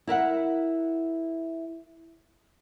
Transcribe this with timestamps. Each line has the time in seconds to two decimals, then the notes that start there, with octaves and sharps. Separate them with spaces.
0.07 E4 A#4 E5 F#5